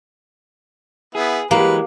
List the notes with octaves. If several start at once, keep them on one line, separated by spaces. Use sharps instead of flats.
B3 E4 G#4
E3 F#3 G#3 A#3 G4 B4